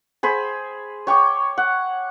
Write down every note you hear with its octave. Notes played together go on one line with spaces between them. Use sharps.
G#4 C5 B5
C#5 G5 C#6 D6
F#5